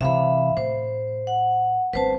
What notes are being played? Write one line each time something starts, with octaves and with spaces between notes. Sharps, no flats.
C3 E3 E5 F5 B5
A2 C5
F#5
G1 C4 B4 C5 A5